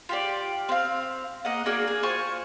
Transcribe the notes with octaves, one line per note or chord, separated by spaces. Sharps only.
F4 G4 D5
C4 F5
A#3 D#5 F#5
A#3 D4 F#4 G#4
G#4
F4 C5 G#5 C#6